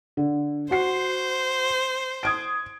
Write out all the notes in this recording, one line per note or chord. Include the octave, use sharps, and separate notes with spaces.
D3
F#4 C5 C7
D#6 G#6 D7